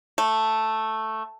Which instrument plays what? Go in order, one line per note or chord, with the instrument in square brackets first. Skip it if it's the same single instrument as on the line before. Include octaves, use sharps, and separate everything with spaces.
[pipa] A3